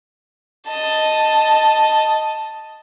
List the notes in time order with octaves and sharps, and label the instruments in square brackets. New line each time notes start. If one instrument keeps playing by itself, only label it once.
[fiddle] D#5 A5